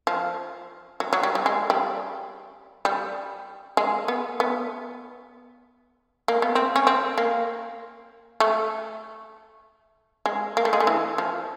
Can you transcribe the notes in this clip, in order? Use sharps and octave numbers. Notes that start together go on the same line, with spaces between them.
F3
F#3
F#3
G3
G3
G#3
G3
G3
G#3
B3
B3
A#3
B3
C4
C#4
C4
A#3
A3
G#3
A#3
A3
G#3
A3
E3
F3